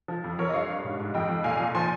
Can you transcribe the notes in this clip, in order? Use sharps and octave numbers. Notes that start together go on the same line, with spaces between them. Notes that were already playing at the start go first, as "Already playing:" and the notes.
F3
F2
F2 A#4 C#5
D#5
G2 C#5 F5
G2
G#2
G#2
F2 D#5 G5
F2
A#2 F5 G#5
A#2
F3 G#5 C6